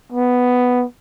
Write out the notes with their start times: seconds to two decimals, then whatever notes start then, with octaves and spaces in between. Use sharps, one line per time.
0.12 B3